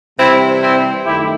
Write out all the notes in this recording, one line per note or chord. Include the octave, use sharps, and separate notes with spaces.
C3 E3 G3 C4 E4
C4 E4
F#2 D#3 A3 E4 G4